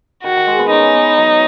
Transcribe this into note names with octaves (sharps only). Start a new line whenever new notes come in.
D#3 F#4
D#3
G#3
B3
C#4 D#4
B3
F#3